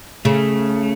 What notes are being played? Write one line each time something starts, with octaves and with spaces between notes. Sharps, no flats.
C#3 A3